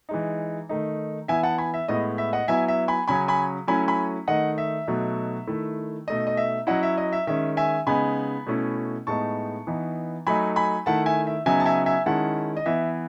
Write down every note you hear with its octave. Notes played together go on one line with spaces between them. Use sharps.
E3 G#3 D#4
D#3 A3 D#4
E3 B3 E4 E5 G#5
F#5 A5
G#5 B5
E5
A2 G#3 B3 E4 D#5
E5
D#5 F#5
F#3 B3 E4 E5 G#5
E5
G#5 B5
C#3 F#3 C#4 G#5 B5
G#5 B5
F#3 A3 C#4 E4 G#5 B5
G#5 B5
D#3 A3 D#4 D#5 F#5
E5
B2 F#3 A3 D#4
D#3 A3 E4
B2 A3 D#4 D#5
D#5
E5
F#3 C#4 E4 D#5 F#5
E5
D#5
E5
D#3 G#3 C#4 E5
E5 G#5
C#3 G#3 B3 D#4 G#5 B5
B2 A3 C#4 E4
A2 G#3 B3 D#4 A5 C#6
E3 B3 D#4
F#3 A3 D#4 G#5 B5
G#5 B5
D#3 A3 E4 F#5 A5
E5 G#5
E5
C#3 F#3 B3 D#4 E5 G#5
A5
E5 G#5
E5 G#5
D#3 G#3 C#4 E4 F#5 A5
D#5
E3 B3 E4 E5